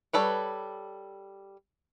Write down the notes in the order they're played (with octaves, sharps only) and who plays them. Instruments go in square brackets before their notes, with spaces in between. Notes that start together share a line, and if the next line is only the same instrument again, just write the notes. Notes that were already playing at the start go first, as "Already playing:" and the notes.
[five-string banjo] G3 A4 B4 C#5